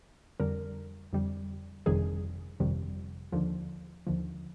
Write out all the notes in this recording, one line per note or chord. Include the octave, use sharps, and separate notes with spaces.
F2 D3 G3 A#4
F2 D3 G3
G1 F2 C3 D#3 G3 G#4
G1 F2 C3 D#3 G3
D#2 D3 F3
D#2 D3 F3